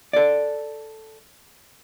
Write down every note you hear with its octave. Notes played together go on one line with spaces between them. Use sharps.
A4 D5